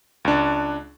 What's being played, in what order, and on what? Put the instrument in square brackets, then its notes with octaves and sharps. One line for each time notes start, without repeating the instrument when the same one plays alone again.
[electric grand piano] C#2 D4